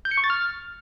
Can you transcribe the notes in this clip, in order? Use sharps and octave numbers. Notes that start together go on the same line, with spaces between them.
G6
C#7
C#6
A6
F6